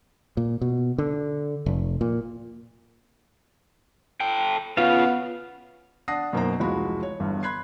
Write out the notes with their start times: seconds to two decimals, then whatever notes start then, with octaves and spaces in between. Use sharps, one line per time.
0.37 A#2
0.61 B2
0.98 D3
1.66 F1
2.01 A#2
4.20 A4 G5
4.77 C#3 B3 F4 F5
6.08 D4 F#5 A5 D#6 A#6 C7
6.33 F#2 B2 A#3 D#4 C5 A#5
6.59 F1 C#2 E3 G#3 F#4 B5
7.03 C#5
7.20 G1 E2 G2
7.43 B5 C6 F#6 G#6 C7